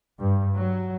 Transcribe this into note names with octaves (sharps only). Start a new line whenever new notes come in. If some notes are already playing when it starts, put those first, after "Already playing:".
G2
F#3